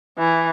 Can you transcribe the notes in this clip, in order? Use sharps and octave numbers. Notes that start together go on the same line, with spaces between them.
E3